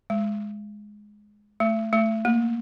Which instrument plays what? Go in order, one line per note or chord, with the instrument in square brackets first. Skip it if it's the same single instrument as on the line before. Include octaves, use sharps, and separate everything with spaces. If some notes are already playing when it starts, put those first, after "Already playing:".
[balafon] G#3
A3
A3
A#3